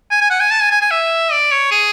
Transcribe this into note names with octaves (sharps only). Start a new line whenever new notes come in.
G#5
G#5
F#5
G#5
A5
G#5
G#5
G#5
E5
D5
C#5
G#4